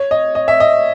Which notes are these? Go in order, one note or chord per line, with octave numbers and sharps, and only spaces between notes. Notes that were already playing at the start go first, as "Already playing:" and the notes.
Already playing: C#5
D#5
D#5
E5
D#5